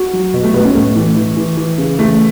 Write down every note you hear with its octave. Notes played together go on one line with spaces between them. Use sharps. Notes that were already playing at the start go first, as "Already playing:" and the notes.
Already playing: F#4
F#3
B2
A3
B2 B3
C#4
A2 A3
E3
E3
E3
E3
C#3
E3 A3